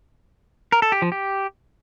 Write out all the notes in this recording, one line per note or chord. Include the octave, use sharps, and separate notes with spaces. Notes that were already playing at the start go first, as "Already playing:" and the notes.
A#4
A4
G4
F3
G4